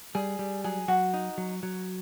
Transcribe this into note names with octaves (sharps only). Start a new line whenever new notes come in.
G3 G#4
G3
F#3 G#4
F#3 F#4
D#4
F#3
F#3